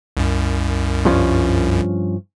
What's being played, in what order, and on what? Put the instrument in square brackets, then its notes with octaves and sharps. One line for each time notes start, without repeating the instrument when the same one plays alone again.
[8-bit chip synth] C2 F#2
[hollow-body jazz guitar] G2 F3 C#4